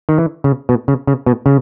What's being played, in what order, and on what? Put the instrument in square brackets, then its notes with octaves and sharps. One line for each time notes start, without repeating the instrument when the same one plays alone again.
[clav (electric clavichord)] D#3
E3
C#3
B2
C#3
C#3
B2
C#3